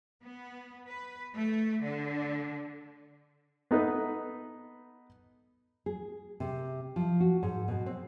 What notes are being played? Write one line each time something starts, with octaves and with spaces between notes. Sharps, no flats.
B3
B4
A3
D3
B3 D#4 A4 B4
G#4
C3
F3
F#4
G#2
B2
C4